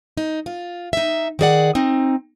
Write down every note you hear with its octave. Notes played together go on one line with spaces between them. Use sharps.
D#4
F4
D#4 E5
D#3 B3 G#4 D5 F#5
C4 D#4